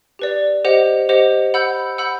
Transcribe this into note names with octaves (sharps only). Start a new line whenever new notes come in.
G4 B4 D5
G4 C5 D#5 F#5
G4 C5 D#5 F#5
F#5 B5 E6 G6
F#5 B5 E6 G6